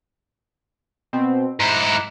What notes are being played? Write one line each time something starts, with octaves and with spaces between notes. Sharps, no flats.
B2 C4
G#2 E4 A#5 D6 F#6